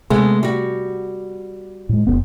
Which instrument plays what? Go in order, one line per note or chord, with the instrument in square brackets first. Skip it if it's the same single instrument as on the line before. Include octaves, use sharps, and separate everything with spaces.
[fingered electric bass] C3 [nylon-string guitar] G#3 A3 B3
[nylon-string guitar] G3 F#4
[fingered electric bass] A2 G#3
F1 D#2 B3